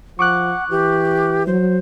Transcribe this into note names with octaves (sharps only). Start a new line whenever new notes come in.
F3 F#5 C#6 D6 F#6
E3 G4
F#3 C5